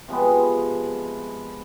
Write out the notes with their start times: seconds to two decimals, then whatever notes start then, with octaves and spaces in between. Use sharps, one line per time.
0.08 C3 F3 G#3 B3